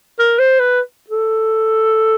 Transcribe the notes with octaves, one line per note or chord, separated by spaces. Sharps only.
A#4
C5
B4
A4